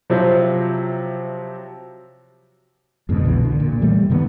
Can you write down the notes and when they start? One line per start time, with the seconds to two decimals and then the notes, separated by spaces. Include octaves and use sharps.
0.10 C3 F3 F#3 E4 C5
3.09 F2 G#2 B2 D3
3.23 B1 B2 E3
3.45 D3
3.60 A#2
3.81 E3 G3 A3
4.10 G2 C3 D#3 B3